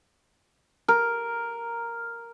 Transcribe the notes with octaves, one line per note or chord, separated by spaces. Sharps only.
A#4